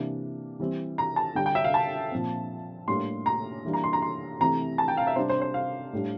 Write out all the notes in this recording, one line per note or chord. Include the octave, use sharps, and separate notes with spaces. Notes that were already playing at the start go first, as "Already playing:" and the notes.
Already playing: C3 E3 A#3 D4
E3 G3 C4
A#5
A5
D3 G3 D4 G5
G5
E5
F5
A5
A#2 F3 C4
A2 G3 A#3 D4 C6
A#5
E3 G3 A#3 D4
A#5
C6
A#5
C6
C3 E3 A3 C4 A#5
A5
G5
F5
E5
C3 G3 D4 C5
C5
C5
F5
A2 G3 D4